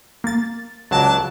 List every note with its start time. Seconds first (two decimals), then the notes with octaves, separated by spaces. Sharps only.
0.24 A#3 A6
0.91 C#2 F#3 D4 A5